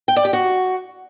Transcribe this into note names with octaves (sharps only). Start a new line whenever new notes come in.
G5
D5
G4
F#4